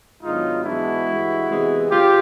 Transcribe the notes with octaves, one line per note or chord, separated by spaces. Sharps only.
G#2 D#3 F#3 B3 D4 D#4 F4
G#2 E3 G#3 B3 D4 E4 F#4
G2 E3 G#3
C3 E3 G#3 B3
F#2 C#3 F4 G4